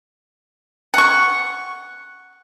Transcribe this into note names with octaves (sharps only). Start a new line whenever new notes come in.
F#5 C#6